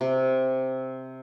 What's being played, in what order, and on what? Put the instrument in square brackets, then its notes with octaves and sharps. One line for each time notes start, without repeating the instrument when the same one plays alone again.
[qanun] C3